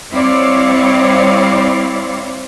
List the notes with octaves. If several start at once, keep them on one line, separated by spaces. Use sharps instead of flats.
G3 C4 E4 C#5 D5 F5